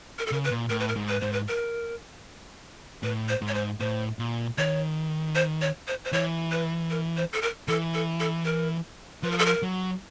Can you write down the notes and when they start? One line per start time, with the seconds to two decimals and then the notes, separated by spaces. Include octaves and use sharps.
0.19 A#4
0.26 A4
0.31 C#3 A#4
0.44 B4
0.51 A#2
0.70 A2 A#4
0.80 B4
0.88 A#4
0.96 G#2
1.08 B4
1.21 G#2 C5
1.33 B4
1.48 A#4
3.03 A2 B4
3.29 C5
3.41 G#2
3.48 C#5
3.54 C5
3.80 A2 C5
4.19 A#2
4.58 D#3 C#5
5.35 C5
5.62 C#5
5.87 C5
6.05 C5
6.12 E3 C#5
6.51 B4
6.90 A#4
7.17 C5
7.33 A4
7.42 A#4
7.68 E3 A4
7.94 A4
8.20 A4
8.45 A#4
9.23 F3 B4
9.31 A#4
9.38 A4
9.46 A#4
9.62 F#3